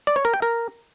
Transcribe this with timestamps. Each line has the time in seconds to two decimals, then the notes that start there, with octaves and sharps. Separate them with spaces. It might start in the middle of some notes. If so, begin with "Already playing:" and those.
0.07 D5
0.16 C#5
0.25 A#4
0.34 G5
0.42 A#4